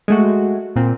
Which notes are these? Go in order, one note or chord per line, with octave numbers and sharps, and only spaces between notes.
G#3 A3 F#4
A#2 C4